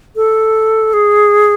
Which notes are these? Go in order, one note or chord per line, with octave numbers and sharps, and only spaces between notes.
A4
G#4